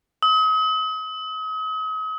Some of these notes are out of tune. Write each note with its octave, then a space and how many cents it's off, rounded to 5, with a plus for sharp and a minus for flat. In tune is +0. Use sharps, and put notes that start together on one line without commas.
D#6 +40